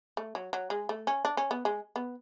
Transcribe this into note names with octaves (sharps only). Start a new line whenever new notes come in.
A3
F#3
F#3
G#3
A3
C#4
D4
C#4
B3
G#3
B3